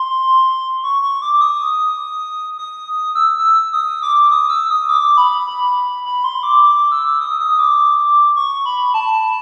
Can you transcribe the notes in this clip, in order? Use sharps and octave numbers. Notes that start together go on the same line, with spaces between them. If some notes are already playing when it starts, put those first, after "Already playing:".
Already playing: C6
C#6
C#6
D6
D6
D#6
D#6
E6
E6
D#6
D6
D#6
E6
D#6
D6
B5
B5
B5
C6
D6
D6
E6
D#6
D#6
D6
C#6
B5
A5